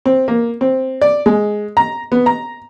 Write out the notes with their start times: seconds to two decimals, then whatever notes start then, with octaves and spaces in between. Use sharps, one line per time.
0.06 C4
0.28 A#3
0.61 C4
1.02 D5
1.26 G#3
1.77 A#5
2.12 B3
2.26 A#5